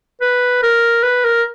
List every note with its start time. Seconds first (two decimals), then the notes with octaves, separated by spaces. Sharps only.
0.21 B4
0.63 A#4
1.03 B4
1.25 A#4